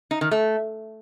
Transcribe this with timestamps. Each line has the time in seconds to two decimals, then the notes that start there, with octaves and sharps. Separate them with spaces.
0.11 D#4
0.21 D#3
0.31 A3